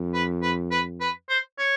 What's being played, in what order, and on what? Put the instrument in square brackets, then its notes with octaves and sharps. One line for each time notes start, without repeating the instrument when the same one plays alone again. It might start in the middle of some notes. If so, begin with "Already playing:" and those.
Already playing: [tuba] F2
[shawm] B4
B4
B4
B4
C5
C#5